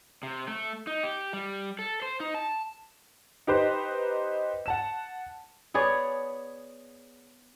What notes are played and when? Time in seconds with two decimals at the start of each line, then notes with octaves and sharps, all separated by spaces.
0.23 C3
0.48 A3
0.87 D#4
1.03 G4
1.33 G3
1.79 A4
2.02 C5
2.20 D#4
2.35 A5
3.47 D#4 G4 B4 C5 D#5
4.66 F#5 A5 E7
5.74 B3 G#4 C#5 D5